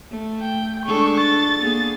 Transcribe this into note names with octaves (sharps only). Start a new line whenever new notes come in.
A3
G5
G#3 D4 A4 C#6
A6
A#3 B3 G#4